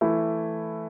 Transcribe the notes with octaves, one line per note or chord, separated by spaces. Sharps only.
E3 A3 E4